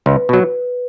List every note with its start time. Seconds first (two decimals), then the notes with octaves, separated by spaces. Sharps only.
0.06 C#2 B4
0.29 B2 F#3